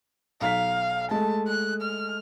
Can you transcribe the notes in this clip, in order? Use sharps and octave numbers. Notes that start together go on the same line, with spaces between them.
B1 F5 A#5 B6
G#3 A3 A5
F#6
F6